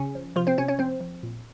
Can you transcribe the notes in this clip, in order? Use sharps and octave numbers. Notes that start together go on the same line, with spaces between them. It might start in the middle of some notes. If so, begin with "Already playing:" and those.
Already playing: C#3 C#4
F3
C3 F3 F4
C4 C5
C3 C#4 C#5
C#4 C#5
F3 C4 C5
F3
A#2